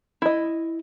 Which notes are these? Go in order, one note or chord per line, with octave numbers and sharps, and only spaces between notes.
E4 D#5